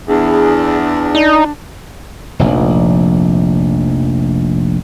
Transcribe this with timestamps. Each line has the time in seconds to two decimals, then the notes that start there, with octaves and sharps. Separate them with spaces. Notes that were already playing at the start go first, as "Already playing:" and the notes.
0.08 E2 D4 G#4
1.15 D#4 D5
2.39 F1 A#1